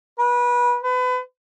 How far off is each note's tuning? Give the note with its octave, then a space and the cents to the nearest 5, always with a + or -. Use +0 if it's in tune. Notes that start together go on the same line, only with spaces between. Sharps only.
B4 -25
B4 +30